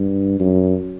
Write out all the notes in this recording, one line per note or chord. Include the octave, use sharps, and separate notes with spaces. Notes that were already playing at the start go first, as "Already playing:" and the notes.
Already playing: G2
F#2